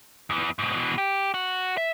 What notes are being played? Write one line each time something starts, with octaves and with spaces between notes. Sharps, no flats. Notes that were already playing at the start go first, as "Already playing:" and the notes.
E2 E3
G#2 B2
B2 E3
G4
F#4
E5